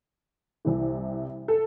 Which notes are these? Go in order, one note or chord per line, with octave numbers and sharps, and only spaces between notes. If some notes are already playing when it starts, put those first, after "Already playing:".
C2 C3 E3
A4